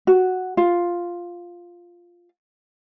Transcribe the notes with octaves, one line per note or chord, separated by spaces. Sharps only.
F#4
F4